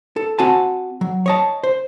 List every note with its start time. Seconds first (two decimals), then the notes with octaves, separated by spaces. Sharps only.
0.16 A4
0.39 C4 F#4 G#5 A5
1.01 F#3
1.26 C#5 D#5 A5
1.64 C5